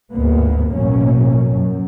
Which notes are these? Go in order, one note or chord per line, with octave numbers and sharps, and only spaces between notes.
G1 D2 G#2 A#3 B3
A1 F#2 B2 F#3 A#3 C#4
F#2